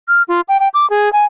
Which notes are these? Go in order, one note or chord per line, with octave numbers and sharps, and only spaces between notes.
F6
F4
G5
G5
D6
G#4
G#5